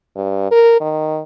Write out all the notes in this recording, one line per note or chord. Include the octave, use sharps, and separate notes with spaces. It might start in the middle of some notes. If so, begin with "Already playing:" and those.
G2
A#4
D#3